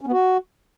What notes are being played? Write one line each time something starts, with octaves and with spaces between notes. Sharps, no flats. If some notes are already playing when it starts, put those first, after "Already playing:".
C#4
B3
F#4